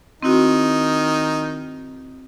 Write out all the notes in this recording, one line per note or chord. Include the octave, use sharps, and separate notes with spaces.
D#3 C4 D#4 E4 F#4